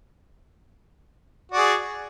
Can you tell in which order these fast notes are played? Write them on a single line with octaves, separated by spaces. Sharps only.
F#4 D5 G#4